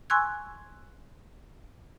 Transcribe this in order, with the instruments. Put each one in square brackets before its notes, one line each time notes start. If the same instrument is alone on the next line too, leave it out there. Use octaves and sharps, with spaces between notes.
[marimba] G#5 C6 C#6 E6 F#6 G#6